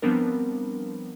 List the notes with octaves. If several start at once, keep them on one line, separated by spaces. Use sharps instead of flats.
F3 G3 B3 C4 D4 A#4